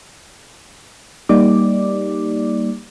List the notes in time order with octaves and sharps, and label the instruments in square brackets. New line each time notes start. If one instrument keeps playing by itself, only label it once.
[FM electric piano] G3 A#3 D#4 G4 D5 D6